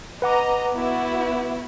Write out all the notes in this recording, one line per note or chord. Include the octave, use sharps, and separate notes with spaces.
B4 D#5 F#5 A#5 D6
B3 E4 F#4